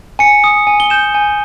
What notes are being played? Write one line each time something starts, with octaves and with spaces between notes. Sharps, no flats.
G#5 C#7
D#6
G#5
G7
G6 E7
G#5